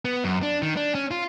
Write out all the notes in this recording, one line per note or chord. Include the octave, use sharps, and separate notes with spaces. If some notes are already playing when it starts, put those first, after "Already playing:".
B3
F#2
D4
D#3
D4
C#4
F4